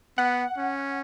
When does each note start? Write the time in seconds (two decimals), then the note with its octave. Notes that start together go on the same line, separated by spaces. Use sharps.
0.18 B3 F#5
0.57 C#4